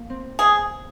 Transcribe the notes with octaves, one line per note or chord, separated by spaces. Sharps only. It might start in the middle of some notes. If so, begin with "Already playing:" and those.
Already playing: A#3
C4
G#4